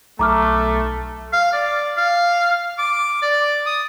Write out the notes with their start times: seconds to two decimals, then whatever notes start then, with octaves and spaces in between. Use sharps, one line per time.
0.19 B1 A3 A#5 D6 F6
1.33 F5
1.53 D5
1.97 F5
2.78 D6
3.22 D5
3.66 D#6